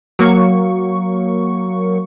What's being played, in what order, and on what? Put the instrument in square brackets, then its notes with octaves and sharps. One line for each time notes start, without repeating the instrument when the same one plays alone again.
[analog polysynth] F#3 A#3 C#6